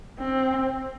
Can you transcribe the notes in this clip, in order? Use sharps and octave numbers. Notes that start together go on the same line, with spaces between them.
C4